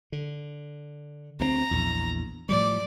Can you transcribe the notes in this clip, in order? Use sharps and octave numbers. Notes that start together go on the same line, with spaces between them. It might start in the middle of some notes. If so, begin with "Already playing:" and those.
D3
D2 A#3 C4 A#5
A#1 E2
A2 F3 G3 D5